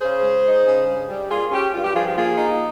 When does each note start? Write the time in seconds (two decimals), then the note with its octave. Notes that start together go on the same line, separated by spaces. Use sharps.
0.02 C#3 G#4 C5
0.23 G#3
0.44 D#4
0.66 C#3
0.87 G2
1.09 G3
1.30 A#3 F4 G#4
1.52 C#4 G4
1.73 G2 F4
1.84 G4
1.95 F3 F4 G#4
2.06 G4
2.16 A#3 F4 G#4
2.38 D#4